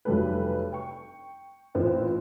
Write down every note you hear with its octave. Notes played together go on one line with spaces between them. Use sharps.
F1 F#3 G3 A4 B4
G5 C#6
A1 A#2 C4 B4